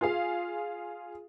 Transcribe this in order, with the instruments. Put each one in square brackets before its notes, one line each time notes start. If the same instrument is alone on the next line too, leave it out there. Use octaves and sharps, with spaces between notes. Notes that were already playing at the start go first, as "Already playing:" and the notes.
[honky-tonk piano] F4 G#4 F5